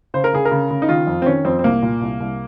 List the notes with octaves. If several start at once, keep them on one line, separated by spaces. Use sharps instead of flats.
C#3 C5
A#4
C#3 G#4
A#4
C#3
C#3
D#4
D#3 F4
F2
C4
D#3 C#4
F2 C4
C4
C2 A#3
A#2
C2
C2